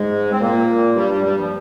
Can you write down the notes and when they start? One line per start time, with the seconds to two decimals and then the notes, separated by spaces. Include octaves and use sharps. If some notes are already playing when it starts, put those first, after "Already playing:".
Already playing: G#2 G#3
0.32 C4
0.41 A#2 A#3
0.96 G2 G3
1.10 G2 G3
1.24 G2 G3
1.37 F3